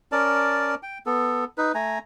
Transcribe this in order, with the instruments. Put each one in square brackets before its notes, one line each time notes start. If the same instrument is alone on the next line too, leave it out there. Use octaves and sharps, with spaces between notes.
[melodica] C#4 A#4 D5 A5
G5
B3 A4
D#4 B4
A3 G#5 A#5